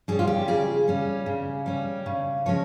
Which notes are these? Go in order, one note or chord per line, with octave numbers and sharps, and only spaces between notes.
G3 C#4 G#4
F4
G4
C#3 G#4
G3 C#4
C#3
G3 C#4
C#3
F3 G#3 C#4 C#5